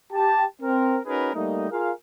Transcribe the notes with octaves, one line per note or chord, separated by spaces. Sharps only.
G4 A5
C4 A#4
C#4 D#4 F#4 G#4 A#4 B4
G3 A3 A#3 D#4
F4 G#4 A#4 F5